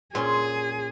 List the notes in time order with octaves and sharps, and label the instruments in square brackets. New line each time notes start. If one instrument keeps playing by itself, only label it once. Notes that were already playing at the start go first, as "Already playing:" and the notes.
[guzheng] A#2 C#4 C6 [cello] G#4